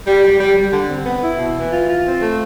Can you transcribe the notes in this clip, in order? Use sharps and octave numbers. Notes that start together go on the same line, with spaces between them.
G3
G3
G3
G3
D3
C4
B3
E4
B2
E3
F4
F4
C4
A3